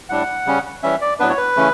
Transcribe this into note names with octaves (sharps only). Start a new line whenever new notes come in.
A2 G3 D4 F#5
C#3 G3 C#4
E3 G3 C#4 E5
D5
A2 F#3 B3 D4 B4
C#5
B4
C#3 E3 A3 C#4